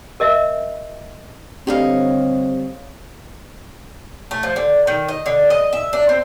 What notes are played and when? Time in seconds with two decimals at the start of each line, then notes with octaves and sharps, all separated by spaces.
0.20 A#4 D#5 E5
1.67 D3 G3 C4 C#5 D#5 F5
4.31 A3
4.43 F3
4.56 D3
4.87 D#3
5.08 D#5
5.26 D3
5.50 D#5
5.73 E5
5.93 D4
6.09 C4